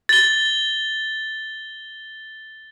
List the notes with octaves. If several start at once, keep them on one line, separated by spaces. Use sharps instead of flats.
A6 G7